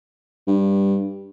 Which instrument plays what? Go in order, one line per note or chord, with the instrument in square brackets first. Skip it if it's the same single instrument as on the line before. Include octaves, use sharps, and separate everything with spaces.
[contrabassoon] G2